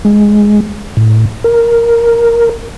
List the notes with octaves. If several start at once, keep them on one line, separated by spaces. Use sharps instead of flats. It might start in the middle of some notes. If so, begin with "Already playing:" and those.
G#3
A2
A#4